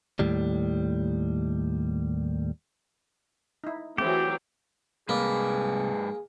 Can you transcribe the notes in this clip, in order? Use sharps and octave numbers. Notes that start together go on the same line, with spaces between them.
D#2 A2 G3
D#4 E4
E3 F#3 A3 C4 G4 G#4
C2 G#2 A#3 G#4 B4 D5